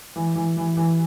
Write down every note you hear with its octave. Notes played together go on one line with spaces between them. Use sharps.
E3
E3
E3
E3